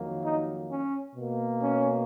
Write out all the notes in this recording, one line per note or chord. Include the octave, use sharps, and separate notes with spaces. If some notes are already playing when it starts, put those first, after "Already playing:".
Already playing: F2 D#3 F#3 A#3
D#4
C#4
B2 A#3
C#4